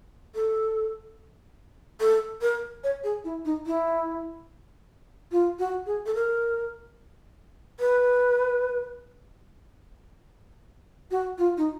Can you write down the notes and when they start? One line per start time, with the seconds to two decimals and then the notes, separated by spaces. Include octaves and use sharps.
0.35 A4
2.01 A4
2.42 A#4
2.84 C#5
3.04 G#4
3.24 E4
3.45 D#4
3.66 E4
5.32 F4
5.59 F#4
5.86 G#4
6.06 A4
6.15 A#4
7.80 B4
11.11 F#4
11.38 F4
11.57 D#4